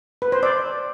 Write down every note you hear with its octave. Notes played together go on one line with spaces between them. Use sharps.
B4
C5
D5